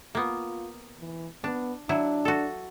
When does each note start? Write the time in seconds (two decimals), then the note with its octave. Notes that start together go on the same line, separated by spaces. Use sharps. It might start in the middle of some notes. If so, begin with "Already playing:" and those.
0.15 A#3 B3 F4
1.00 E3
1.44 B3 D4
1.89 F#3 D4 E4
2.25 F#4 A4